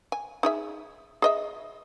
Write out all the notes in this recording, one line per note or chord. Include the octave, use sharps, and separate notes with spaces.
G#5
D#4 G#4 E5
G#4 D#5 E5